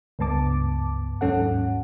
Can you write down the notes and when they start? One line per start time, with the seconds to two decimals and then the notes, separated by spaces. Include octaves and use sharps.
0.19 C#2 G2 B3 A5 D6
1.21 D#2 G#2 F#3 C#4 A4 F#5